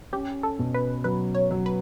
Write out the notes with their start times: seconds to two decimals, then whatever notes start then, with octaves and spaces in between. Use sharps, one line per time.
0.13 C#4 G4
0.43 A4
0.59 B2
0.74 B4
1.04 F#3 B4
1.35 C#5
1.51 F#3
1.66 B4